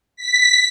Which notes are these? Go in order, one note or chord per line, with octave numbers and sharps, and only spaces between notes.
B6